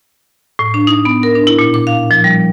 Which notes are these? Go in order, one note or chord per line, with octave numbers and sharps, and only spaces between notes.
A2
D4
D#4
B3
A#4
D4
E4
A#2
D6
F5
F3
G3